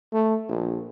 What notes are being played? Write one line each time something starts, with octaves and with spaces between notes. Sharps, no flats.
A3
A#1